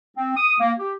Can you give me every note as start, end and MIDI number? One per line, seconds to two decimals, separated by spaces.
0.17 0.36 60
0.37 0.55 87
0.60 0.72 58
0.79 0.93 67